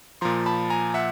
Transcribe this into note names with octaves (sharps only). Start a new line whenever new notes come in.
A#2 F3 A#5 C6
A5 B5
G#5 A#5
E5 F#5